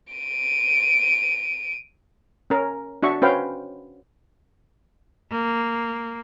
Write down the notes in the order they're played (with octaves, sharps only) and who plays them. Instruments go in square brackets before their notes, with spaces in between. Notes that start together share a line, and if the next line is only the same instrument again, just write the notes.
[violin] D7 D#7
[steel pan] C#4 A#4
D4 F#4 E5 C#6
C#4 F#4 B4 C5 F5 G5
[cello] A#3